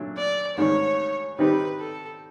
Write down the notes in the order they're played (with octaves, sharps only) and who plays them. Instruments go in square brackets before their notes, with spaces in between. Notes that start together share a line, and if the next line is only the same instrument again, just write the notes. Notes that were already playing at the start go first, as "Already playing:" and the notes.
Already playing: [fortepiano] A#2 F#3 A3 D4
[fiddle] D5
[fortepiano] A1 G#2 D#3 [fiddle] C#5
[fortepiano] D#3 G3 C4 D#4 G4 [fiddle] B4
[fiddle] A4